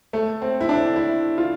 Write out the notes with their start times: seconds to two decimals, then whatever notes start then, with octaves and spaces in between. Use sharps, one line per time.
0.13 A3
0.42 C4
0.61 E4
0.69 D4
0.96 E4
1.38 F4